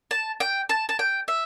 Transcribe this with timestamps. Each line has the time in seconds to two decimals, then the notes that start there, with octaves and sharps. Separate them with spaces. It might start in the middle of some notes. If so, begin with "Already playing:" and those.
0.11 A5
0.40 G5
0.69 A5
0.89 A5
0.99 G5
1.28 E5